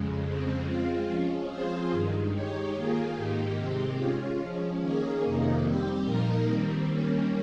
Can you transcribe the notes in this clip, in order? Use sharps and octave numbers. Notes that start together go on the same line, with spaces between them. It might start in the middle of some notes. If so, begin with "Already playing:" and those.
Already playing: F2 C#3 G#3
F2 C#3 G#3 C4
G#3 C4 F4
F3 G#3 C#4
F3 C4 F4 G#4 C5
G2 D#3 G#3
G#3 D#4 G4 C#5
D#3 A#3 F4 G#4
G#2 D#3 A#3 D#4 G4
C3 D#3 G#3 C4 G4
G#3 C#4 F4
F3 G#3 C#4
D#3 A#3 C#4 G#4
F2 C3 D#3 A#3 D#4
G3 C4 G4
A#2 F3 A#3 D#4 A#4
D#3 G3 C4
D#3 G3 A#3 C#4